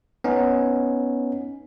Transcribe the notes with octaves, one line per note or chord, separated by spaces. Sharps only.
B3 C#4 D#4